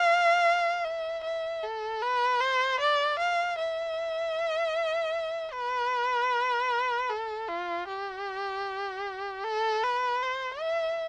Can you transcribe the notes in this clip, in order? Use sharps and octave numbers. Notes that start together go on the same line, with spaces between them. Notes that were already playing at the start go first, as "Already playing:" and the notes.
Already playing: F5
E5
E5
A4
B4
C5
D5
F5
E5
B4
A4
F4
G4
A4
B4
C5
E5